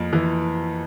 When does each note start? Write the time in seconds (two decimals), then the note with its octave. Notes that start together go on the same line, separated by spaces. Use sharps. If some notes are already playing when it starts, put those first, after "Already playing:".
Already playing: F2 A#3
0.13 E3